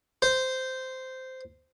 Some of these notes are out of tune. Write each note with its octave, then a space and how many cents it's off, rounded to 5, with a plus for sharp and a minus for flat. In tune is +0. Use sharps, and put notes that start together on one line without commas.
C5 -10